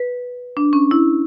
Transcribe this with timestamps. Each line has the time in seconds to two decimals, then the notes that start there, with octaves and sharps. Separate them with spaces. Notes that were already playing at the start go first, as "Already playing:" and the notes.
Already playing: B4
0.57 D4
0.73 C#4
0.91 E4